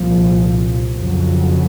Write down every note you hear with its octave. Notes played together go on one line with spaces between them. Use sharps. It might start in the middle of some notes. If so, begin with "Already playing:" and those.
Already playing: C2 A#2 F3
F2 C#3 F#3